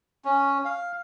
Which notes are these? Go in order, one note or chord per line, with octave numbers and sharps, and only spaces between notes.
C#4
F5